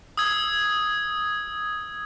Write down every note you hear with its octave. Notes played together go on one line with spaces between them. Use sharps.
D#6 E6 G#6